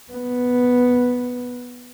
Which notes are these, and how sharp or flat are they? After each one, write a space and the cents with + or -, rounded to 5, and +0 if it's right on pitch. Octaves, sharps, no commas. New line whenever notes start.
B3 +0